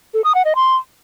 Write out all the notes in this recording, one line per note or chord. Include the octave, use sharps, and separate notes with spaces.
A4
D#6
F#5
D#5
C6